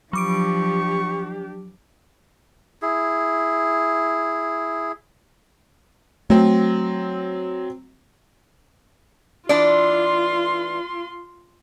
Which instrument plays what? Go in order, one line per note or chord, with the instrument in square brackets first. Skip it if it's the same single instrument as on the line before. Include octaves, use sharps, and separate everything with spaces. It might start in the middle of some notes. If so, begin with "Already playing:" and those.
[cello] F3 [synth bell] F#3 D6 D7 [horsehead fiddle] D4 G4 [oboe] C#6
[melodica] E4 G#4
[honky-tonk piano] F#3 C4 [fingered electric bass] A3
[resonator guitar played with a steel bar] E3 D4 D5 [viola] F4 C6